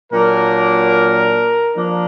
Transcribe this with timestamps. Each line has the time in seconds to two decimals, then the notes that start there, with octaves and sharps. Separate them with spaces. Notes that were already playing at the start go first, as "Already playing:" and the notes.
0.12 A#2 F#3 A#3 D4 A#4
1.76 F3 A#3 D4